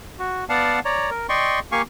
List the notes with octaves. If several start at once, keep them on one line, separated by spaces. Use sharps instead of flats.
F#4
B3 D5 F5 F#5 A5
C#5 D5 A#5
A#4
D5 D#5 G5 C6 C#6
A#3 G4 F5 G#5 C#6